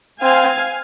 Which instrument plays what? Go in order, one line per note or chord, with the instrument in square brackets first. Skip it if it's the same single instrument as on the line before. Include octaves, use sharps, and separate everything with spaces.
[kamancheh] C4 [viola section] F5 G#5